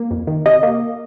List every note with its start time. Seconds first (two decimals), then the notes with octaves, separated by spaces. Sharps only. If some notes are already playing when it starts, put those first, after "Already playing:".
Already playing: A#3
0.11 F2
0.27 D#3
0.46 C3 D#5
0.63 A#3